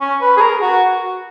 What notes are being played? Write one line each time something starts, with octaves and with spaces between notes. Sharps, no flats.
C#4
B4
G#4
A#4
F#4